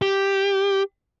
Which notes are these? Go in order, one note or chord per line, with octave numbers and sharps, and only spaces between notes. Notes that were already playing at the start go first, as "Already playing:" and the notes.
G4